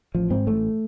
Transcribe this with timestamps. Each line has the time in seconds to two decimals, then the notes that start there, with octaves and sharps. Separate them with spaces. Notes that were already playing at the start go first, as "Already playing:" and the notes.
0.15 A1 F3
0.30 G#2 C4
0.47 A1 A3